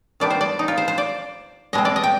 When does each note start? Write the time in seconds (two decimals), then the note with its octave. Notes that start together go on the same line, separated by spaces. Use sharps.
0.20 D#3 G3 B3 D4 D5
0.30 C5
0.41 D5
0.59 D#4
0.68 F4
0.78 C5
0.88 C5
0.98 D5
1.73 B2 G#3 C4 D#5
1.85 D5
1.96 D#5
2.04 G5